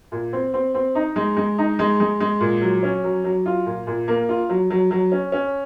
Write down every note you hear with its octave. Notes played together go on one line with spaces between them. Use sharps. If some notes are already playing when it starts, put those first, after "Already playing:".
A#2
C4
C4
C4
D#4
G#3
G#3
D#4
G#3
G#3
G#3
A#2
F#3
C#4
F#3
F#3
F4
A#2
A#2
A#3
F4
F#3
F#3
F#3
C#4
C#4